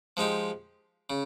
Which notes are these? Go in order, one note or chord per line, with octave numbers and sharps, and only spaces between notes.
F3 G#3 D#4 G4
C#3